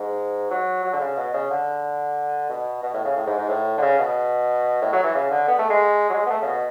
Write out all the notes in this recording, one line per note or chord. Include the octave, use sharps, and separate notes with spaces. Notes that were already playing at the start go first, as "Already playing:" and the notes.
Already playing: G#2
F#3
F#3
D3
C#3
B2
C#3
D3
B2
B2
A2
C#3
A2
G#2
G#2
A2
D3
C#3
B2
A2
F#3
E3
C#3
D3
B3
A3
G#3
F#3
G#3
B3
A3
C#3
B2